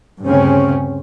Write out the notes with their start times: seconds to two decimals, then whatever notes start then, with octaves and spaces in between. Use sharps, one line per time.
0.23 D2 G2 C#3 C4 C#4